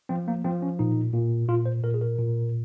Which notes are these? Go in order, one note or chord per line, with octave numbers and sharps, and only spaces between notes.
F3 C4
A#3
F3 C4
C#4
A#2 D#4
A#2
A#2 F4
C5
A#2 A#4
G#4
A#4
A#2